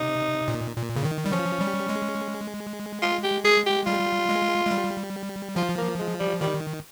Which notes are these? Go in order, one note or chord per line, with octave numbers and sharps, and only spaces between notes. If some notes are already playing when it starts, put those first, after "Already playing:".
Already playing: C3 D#4
A#2
A#2
C#3
D#3
G3
F3 C#4
G3
G#3
F4
G4
G#4
G4
G3 F4
G#3
G#3
G3
F3 F4
A#3
G#3
G3
D#3 G3